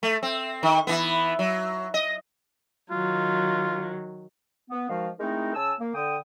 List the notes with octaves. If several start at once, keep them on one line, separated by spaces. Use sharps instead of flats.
A3
C4
D#3
E3 B3
F#3
D#5
D#3 F#3 F4
B3
D#3 F3 G#3 F#4 F5
G#3 A3 C4 D#4 E4 A#4
C#3 G#5 A5 E6
A#3
D3 G5 D#6